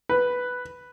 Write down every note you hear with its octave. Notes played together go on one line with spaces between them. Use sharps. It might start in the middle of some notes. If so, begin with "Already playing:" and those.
B4